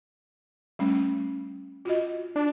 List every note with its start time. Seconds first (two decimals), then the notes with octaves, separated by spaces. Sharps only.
0.79 G3 A3 C#4
1.85 F4 F#4 D#5
2.36 D4